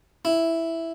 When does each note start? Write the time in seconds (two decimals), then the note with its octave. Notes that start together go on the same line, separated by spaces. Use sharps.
0.25 E4